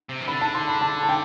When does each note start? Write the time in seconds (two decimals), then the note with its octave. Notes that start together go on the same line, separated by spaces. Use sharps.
0.09 C3
0.21 E3
0.28 D3 B5
0.41 A5
0.54 C6
0.68 B5
0.81 A5
1.03 A5
1.09 G5